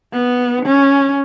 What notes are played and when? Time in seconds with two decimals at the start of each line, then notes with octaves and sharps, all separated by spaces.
0.13 B3
0.66 C#4